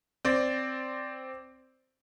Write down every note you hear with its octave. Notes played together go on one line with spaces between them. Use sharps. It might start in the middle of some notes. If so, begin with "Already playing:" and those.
C4 D5